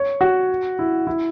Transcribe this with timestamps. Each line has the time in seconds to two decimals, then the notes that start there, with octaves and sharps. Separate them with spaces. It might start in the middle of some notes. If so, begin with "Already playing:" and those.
Already playing: C#5
0.21 F#4
0.79 E4
1.07 E4